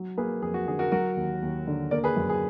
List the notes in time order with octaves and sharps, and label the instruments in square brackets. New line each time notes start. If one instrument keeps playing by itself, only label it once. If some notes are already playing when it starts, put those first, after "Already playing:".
Already playing: [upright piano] F#3
[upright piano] A#3 [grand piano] G#4 B4
[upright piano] F2 [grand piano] G#4
[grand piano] F#4
[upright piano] D3 [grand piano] G#4
[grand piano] F#4 A#4
[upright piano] F#3 [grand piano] F#4 A#4
[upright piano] D#2
D#2
D3
[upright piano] A#3 [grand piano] A#4 D5
[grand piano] G#4 B4
[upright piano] F#2
[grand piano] G#4